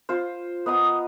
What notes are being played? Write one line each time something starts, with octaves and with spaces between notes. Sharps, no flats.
F4 C5
B3 D#5 A#5 D#6